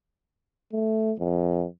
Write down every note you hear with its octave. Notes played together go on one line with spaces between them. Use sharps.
A3
F2